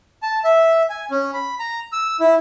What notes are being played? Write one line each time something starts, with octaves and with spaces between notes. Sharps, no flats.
A5
E5
G#5
C#4
B5
A#5
E6
E4